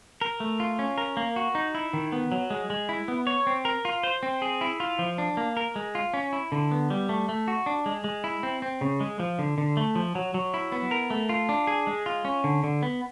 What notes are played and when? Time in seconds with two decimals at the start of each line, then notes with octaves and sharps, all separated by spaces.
0.21 A#4
0.40 A3
0.60 F4
0.79 C#4
0.98 A#4
1.17 A#3
1.36 F#4
1.55 D#4
1.75 E4
1.93 D#3
2.12 B3
2.32 F#3
2.50 G#3
2.70 G#3
2.89 E4
3.08 B3
3.27 C#5
3.47 C4
3.65 A#4
3.85 F4
4.03 C5
4.23 C4
4.42 G#4
4.61 E4
4.80 F4
4.99 F3
5.18 D4
5.37 A#3
5.57 A#4
5.76 G#3
5.95 F4
6.14 C#4
6.33 E4
6.52 D3
6.71 B3
6.90 G3
7.09 A3
7.29 A3
7.48 F#4
7.66 D4
7.86 G#3
8.04 G#3
8.24 E4
8.43 C4
8.62 C4
8.81 C#3
9.00 G#3
9.20 F3
9.39 D3
9.58 D3
9.77 A3
9.95 F3
10.15 F#3
10.34 F#3
10.54 E4
10.72 B3
10.91 A#4
11.10 A3
11.29 F4
11.49 D4
11.67 G#4
11.87 G#3
12.06 F4
12.25 C#4
12.44 D3
12.64 D3
12.83 B3